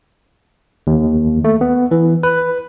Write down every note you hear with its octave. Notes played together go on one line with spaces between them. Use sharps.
D#2
A3
B3
E3
B4